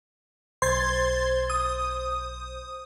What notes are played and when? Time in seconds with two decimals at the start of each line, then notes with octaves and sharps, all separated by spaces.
0.62 B1 C5 C6 G#6 A6
1.50 D#6